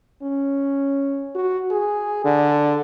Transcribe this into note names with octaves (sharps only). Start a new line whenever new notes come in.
C#4
F#4
G#4
D3